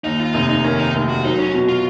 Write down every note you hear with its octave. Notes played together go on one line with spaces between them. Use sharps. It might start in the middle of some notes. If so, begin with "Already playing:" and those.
D#2 D#4
F4
F1 D#4
D#4
D#3 C#4
D#4
F1
F#4
F#3 D#4
C#4
B2
F4